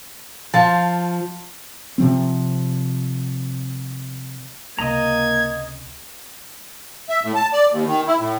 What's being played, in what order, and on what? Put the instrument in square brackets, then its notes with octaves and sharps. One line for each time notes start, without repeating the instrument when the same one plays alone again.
[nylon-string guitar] F3 [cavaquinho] F4 A5
[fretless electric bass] C3 F3 C4
[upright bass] C#2 C3 [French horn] A#3 [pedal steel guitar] D#5 A#5 [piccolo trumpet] G#6
[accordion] E5
A2
A5
D5
D#2
D#3
E4
A2